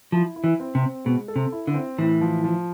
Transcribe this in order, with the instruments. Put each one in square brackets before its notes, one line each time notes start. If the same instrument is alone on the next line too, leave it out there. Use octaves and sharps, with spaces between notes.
[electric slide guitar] F3 [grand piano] E4
[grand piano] E4
[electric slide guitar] E3
[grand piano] C4
[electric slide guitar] C3
[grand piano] C4
[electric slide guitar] B2 [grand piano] G#3
[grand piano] A4
[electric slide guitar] C3
[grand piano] E4
[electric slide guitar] D3
[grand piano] C4
[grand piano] A2 [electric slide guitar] E3
[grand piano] F3
F3